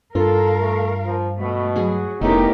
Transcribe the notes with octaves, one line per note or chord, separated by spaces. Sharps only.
G2 F4 A4 A#4 F5
A3
F3
B2 A3
F#3 F#4 G#4
F1 A3 B3 C#4 D#4 E4 G4 A#4